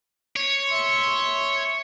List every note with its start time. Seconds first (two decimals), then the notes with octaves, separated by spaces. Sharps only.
0.36 C#5
0.69 E5 C6